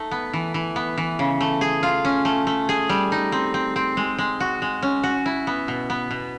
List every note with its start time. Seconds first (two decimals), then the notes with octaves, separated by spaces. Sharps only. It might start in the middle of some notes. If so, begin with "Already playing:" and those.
Already playing: A3 D#4
0.11 B3
0.33 E3
0.54 E3
0.76 B3
0.98 E3
1.19 C#3
1.41 A3
1.61 G#4
1.83 F4
2.05 C#4
2.25 A3
2.47 A3
2.69 G#4
2.89 G3
3.12 D#4
3.32 C4
3.54 C4
3.76 C4
3.97 G#3
4.18 G#3
4.40 F#4
4.62 G#3
4.82 C#4
5.03 F#4
5.26 E4
5.47 B3
5.68 B2
5.90 B3
6.11 B2